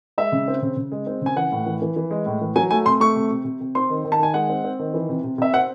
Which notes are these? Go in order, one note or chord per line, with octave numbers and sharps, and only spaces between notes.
G#3 E5
C#3
C4
C#3
C#3
G#3
C4
C#3 G#5
E3 F#5
A2
E3
E3
E3
G#3
A2
E3
F#3 G#5
A3 G#5
C3 C6
A3 C#6
C3
C3
C3
C3
C4 C6
D#3
D#3
A5
D#3 G#5
G#3 F#5
C4
C4
D#3
E3
C3
C3
C3 E5
C4 F#5